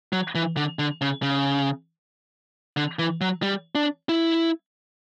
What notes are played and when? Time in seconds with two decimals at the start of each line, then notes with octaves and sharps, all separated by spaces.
0.13 F#3
0.35 E3
0.57 D3
0.79 D3
1.01 C#3
1.23 C#3
2.77 D3
2.99 E3
3.21 F#3
3.42 G3
3.75 D4
4.09 E4